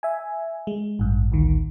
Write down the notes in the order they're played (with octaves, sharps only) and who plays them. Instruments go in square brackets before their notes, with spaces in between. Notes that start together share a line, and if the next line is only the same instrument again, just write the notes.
[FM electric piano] E5 G#5
G#3
A1 G2
A1 D2 D#3